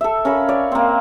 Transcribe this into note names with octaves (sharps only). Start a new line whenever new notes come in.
A4 E5
C#4 A#4 F5 B5
C#5 D5
A#3 C4